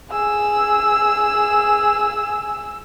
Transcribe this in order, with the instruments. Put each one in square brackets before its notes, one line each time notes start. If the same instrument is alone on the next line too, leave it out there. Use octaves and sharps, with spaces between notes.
[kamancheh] G#4 E6